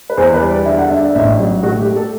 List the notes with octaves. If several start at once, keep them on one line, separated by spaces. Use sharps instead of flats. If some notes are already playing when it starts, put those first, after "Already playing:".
B4
E2 C5
B4
G3
D5
D3 E5
F#5
D4 E5
E5
A1 E5
F#3
A2 F#4
G4
A3
A4